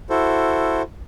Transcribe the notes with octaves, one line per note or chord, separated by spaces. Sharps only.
E4 F#4 A4 C5